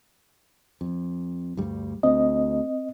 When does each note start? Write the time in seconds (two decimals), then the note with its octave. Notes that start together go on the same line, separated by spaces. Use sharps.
0.81 F2
1.57 D2 G2 G3
2.03 D2 C4 D#5